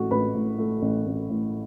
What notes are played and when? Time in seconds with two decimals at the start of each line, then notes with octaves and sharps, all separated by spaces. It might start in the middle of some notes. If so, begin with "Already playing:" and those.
Already playing: A1 A2 A3 F#4
0.11 A1 B4 B5
0.35 A2
0.58 A3
0.82 A1
1.06 A1
1.30 A2